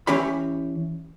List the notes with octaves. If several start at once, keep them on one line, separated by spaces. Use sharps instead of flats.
E3 C#4 G4 C#5 B5